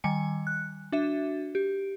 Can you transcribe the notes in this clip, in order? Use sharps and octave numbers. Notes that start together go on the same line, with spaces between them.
D#3 G3 G#5 C#7
F#6
D4 F#4 E5
G4